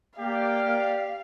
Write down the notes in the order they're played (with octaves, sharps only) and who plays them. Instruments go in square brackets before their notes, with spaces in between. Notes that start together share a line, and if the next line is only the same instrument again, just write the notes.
[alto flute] A#3 [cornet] G4 [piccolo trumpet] D5 [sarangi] F5